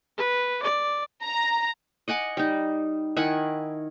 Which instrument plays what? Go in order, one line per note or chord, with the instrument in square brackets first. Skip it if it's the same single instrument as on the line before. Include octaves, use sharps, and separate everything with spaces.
[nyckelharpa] B4
D5
[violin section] A#5
[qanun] D#5 F#5 G#5 D6
G3 D#4
D#3 E4 F#5 G#5